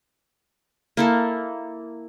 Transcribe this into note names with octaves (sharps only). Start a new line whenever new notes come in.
A#3 E4 A4